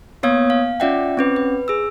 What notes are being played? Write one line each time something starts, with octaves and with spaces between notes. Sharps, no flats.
A#3 B3 C#5 F5 D#6 G#6
F5
C#4 F4 D5 E5 F#5 G5
C4 C#4 B4
B4
G#4 E6